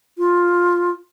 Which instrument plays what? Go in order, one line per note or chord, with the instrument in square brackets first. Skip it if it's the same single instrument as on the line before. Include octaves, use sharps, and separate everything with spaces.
[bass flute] F4